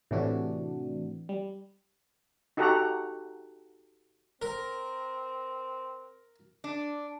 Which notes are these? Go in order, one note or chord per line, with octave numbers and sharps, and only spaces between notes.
A2 C3 E3 D4 F#4
G3
D#4 F#4 G4 A4 F#5 A#5
C4 A#4
D4